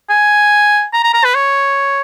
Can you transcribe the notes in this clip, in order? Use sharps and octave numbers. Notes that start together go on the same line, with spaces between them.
G#5
A#5
A#5
A#5
B4
C#5